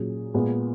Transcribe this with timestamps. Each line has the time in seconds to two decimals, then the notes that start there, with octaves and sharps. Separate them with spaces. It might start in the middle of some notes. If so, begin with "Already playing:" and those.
Already playing: A#2 F#3 C#4 G#4
0.34 A#2 G#3 B3